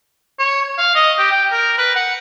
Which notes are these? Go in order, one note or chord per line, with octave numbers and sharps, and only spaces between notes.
C#5
F5
D#5
G4
G5
A#4
B4
F#5